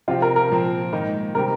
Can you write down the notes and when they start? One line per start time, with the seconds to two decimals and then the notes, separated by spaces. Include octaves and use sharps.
0.08 C3 F3 C4 F4 G4
0.22 A#4
0.36 A#4
0.50 A#2 F3 C4
0.93 G#2 D#3 A#3 D#4
1.35 C3 D#3 G3 C4 G4 A#4